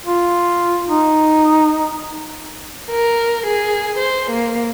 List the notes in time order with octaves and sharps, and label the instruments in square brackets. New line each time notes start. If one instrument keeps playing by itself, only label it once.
[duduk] F4
D#4
[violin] A#4
G#4
C5
A#3